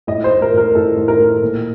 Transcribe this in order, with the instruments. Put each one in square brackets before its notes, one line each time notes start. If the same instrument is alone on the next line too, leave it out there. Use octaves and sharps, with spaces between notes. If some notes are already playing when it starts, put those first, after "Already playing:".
[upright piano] A2 D#5
C5
A2
A#4
A2 A#4
A2 A4
A2
A#4
A2
A#2